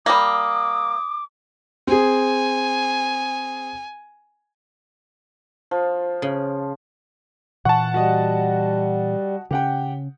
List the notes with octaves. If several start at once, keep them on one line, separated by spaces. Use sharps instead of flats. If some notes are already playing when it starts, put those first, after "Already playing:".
G3 A#3 D6 D#6
C4 G#4 G#5
F3
C#3
A#2 E3 F#5 A5 C#6
G3 F#4 D#5
C#3 C#4 G4 F#5 G5